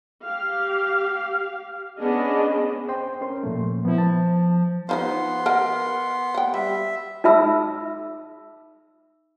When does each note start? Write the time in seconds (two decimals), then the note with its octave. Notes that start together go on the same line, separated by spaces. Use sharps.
0.24 G4 F5
1.98 B3 C#4 D4 G#4 D#5
2.88 C5 G5 C6
3.21 C#4 A#4 C6
3.43 A#2 F3 A3
3.85 F3 B3 E4
3.98 A5
4.89 F3 B3 D#4 C5 C6
5.46 A#4 D#5 F#5
6.35 F#5 G5
6.54 G3 E5
7.24 D#4 G#4 E5 B5 E6